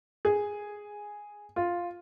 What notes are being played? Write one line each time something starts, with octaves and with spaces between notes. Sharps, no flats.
G#4
F4